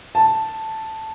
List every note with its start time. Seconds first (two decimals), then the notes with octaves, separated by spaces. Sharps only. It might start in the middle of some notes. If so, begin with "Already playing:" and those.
0.15 A5